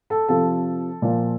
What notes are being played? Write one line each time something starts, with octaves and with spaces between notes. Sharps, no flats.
A4
C3 F3 A4
A#2 F3